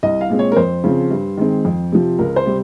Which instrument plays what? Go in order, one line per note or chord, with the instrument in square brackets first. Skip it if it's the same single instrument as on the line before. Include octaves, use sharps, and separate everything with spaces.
[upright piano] C2 D#5
F5
A#2 G#3 C4
C#5
A#4
F2 C5
C#3 F3 C4
G2
D#3 G#3 C4
F2
C3 F3
C#2 A#4
C5
C3 G3